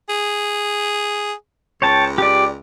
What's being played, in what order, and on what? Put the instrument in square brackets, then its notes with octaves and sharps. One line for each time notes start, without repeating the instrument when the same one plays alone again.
[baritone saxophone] G#4
[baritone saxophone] C#2 [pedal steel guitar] C#5 G5 A5
[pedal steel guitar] G4 D5